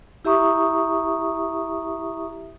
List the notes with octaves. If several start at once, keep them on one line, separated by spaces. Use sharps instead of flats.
E4 G4 E5 A#5 C#6 D#6